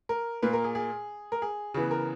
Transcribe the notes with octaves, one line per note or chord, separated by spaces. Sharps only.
A#4
A#2 A#3 B4
A#4
G#4
G#4
A#4
G#4
C#3 E3 B3 G#4
A#4